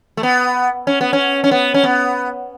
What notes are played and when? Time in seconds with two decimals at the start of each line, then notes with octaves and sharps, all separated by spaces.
0.17 A3
0.23 B3
0.87 C#4
1.01 B3
1.13 C#4
1.44 C#4
1.51 B3
1.74 C#4
1.84 B3